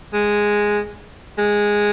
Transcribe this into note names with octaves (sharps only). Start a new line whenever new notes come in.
G#3
G#3